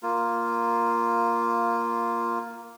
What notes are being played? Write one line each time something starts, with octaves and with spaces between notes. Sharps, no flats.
A#3 F4